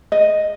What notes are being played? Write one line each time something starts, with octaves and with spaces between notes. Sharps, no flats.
D#5